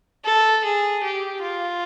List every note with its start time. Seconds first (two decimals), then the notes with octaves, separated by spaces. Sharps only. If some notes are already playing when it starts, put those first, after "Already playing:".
0.25 A4
0.64 G#4
1.03 G4
1.42 F4